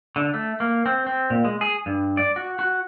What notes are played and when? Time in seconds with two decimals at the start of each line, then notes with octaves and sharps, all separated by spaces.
0.16 D3
0.34 A3
0.60 A#3
0.86 C4
1.07 C4
1.30 A#2
1.45 G#3
1.61 G#4
1.86 G2
2.17 D5
2.36 F#4
2.59 F#4